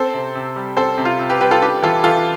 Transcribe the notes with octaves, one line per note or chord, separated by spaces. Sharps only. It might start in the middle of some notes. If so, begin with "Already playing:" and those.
Already playing: C4 A4 C5
C3
C3
G3
C4 A4 C5
C3
F4
C3
G4 B4
G3 G4 B4
F4 A4
D4 G4 B4
E3 F4 A4
E3 F4 A4